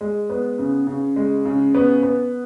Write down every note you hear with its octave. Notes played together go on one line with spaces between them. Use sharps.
G#3
B3
C#3
C#3
G#3
C#3
B3
B3